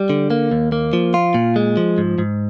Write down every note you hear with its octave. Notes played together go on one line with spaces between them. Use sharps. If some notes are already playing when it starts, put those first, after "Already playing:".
Already playing: G3
D3
A#3
D#2
A#3
F3
F4
A#2
G#3
F3
G#2
G#2